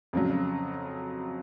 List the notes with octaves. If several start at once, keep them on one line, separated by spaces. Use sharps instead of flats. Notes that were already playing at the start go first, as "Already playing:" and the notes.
F2 C#3 F#3